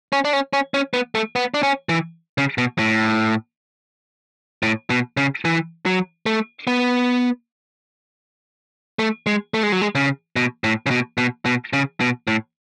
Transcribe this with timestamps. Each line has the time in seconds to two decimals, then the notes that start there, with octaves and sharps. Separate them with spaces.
0.13 C#4
0.25 D4
0.33 C#4
0.53 C#4
0.74 C#4
0.94 B3
1.15 A3
1.36 B3
1.54 D4
1.63 C#4
1.89 E3
2.38 C#3
2.58 B2
2.79 A2
4.63 A2
4.90 B2
5.17 C#3
5.45 E3
5.86 F#3
6.26 A3
6.67 B3
8.99 A3
9.26 G#3
9.54 A3
9.63 G#3
9.72 F#3
9.81 G#3
9.95 C#3
10.36 B2
10.64 A2
10.86 C#3
10.91 B2
11.18 B2
11.45 B2
11.73 C#3
12.00 B2
12.27 A2